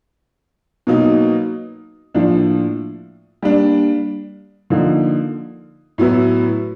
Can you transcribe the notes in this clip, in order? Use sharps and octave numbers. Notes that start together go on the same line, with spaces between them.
B2 F#3 A#3 D#4
A2 F3 A#3 D4
G3 A#3 D4
D3 F3 A#3 D#4
A2 F#3 B3 E4